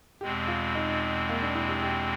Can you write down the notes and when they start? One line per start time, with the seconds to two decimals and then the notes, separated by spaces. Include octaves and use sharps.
0.21 E2 B2 G#3 C4 G4
0.48 F4
0.75 D#4
1.29 A#3
1.42 D4
1.55 E4
1.69 G4
1.82 G4